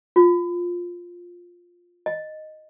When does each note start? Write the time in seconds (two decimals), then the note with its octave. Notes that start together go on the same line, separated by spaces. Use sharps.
0.16 F4
2.06 D#5